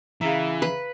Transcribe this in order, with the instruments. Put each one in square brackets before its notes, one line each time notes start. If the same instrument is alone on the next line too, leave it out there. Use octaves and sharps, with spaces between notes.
[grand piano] C#3 G#4 E5 [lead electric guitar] E3 [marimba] F5 A#5
[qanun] B4